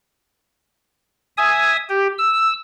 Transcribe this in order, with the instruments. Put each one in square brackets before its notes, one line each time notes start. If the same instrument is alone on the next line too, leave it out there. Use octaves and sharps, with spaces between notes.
[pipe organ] E5 G#5 D#6
G4
E6